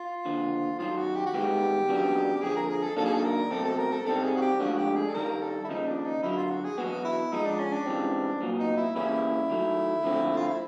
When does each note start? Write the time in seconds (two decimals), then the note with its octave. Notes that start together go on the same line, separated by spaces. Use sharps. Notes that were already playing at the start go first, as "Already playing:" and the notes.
Already playing: F4
0.25 D#2 D3 F3
0.79 F#2 D#3 F#3 F4
0.97 F#4
1.15 G4
1.26 F#4
1.34 G2 D#3 G#3 B3 G4
1.88 E2 C#3 F#3 B3 D4
2.36 G4
2.42 F2 D3 F3 G#4
2.56 A#4
2.69 G#4
2.83 A4
2.96 D#3 F#3 A#3 D4 A4
3.05 G#4
3.14 A4
3.25 A#4
3.51 C2 B2 F#3 A3 C4 A4
3.65 A4
3.78 A#4
3.92 A4
4.05 C3 D#3 G3 C4 A4
4.24 G#4
4.36 F#4
4.42 G4
4.60 G#2 F3 A3 D4 F#4
4.78 G4
4.96 G#4
5.10 A4
5.14 G2 D#3 G3 A#4
5.42 A4
5.64 E4
5.69 D#2 C#3 F3 D#4
5.87 D4
6.05 D#4
6.23 F#2 D3 F#3 E4
6.37 F4
6.50 F#4
6.64 G#4
6.78 E2 B2 F#3 B3 F#4
7.05 E4
7.32 G#2 F3 G#3 D#4
7.45 D4
7.59 C#4
7.73 D4
7.86 C#2 C#3 E3 G3 C4
8.41 C2 A#2 F#3 B3
8.59 D#4
8.77 E4
8.96 C#3 E3 G3 A#3 C#4 E4
9.50 D#3 F#3 A3
10.04 F2 D3 F3 A3 C4
10.37 F4
10.48 E4